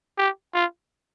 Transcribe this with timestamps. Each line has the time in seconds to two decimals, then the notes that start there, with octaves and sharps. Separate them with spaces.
0.18 G4
0.54 F4